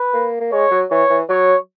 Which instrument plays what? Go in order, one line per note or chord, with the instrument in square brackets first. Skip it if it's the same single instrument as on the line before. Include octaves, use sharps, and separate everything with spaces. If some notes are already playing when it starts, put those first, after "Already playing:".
Already playing: [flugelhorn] B4
[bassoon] A#3
A#3
[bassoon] G#3 [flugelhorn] C#5
[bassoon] F#3
[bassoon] E3 [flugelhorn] C#5
[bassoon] E3
[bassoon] F#3 [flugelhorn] C#5